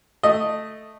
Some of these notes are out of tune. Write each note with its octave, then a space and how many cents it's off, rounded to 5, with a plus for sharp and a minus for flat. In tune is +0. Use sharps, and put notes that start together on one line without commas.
A3 +0 D#5 +0